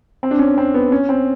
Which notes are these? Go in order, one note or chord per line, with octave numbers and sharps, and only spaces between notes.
C4
D4
C#4
C4
B3
C#4
C4